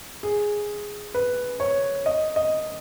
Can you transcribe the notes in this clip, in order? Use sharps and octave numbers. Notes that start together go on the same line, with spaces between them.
G#4
B4
C#5
D#5
D#5